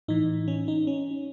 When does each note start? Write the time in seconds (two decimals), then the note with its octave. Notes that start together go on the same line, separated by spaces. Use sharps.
0.08 A2 E3 D#4
0.48 C#4
0.68 D#4
0.87 C#4